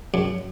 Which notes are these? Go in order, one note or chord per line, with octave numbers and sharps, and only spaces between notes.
F#2